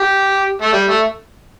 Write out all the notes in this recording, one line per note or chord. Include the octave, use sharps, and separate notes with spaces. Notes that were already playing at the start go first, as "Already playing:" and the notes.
Already playing: G4
A3
G3
A3